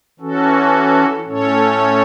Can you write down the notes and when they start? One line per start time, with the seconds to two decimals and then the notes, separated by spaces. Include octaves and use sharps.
0.20 E3 C#4 F#4 A4
1.27 A2 A3 C#4 A4 C#5